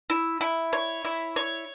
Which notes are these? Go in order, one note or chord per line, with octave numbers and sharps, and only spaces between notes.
E4
E4
C#5
E4
C#5